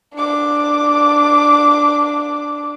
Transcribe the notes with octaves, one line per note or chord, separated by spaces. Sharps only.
D4 D6